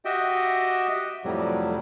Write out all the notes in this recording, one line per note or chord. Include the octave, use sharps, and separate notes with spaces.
F#4 G4 D#5 E5 G5
F2 A2 C3 F#3 G3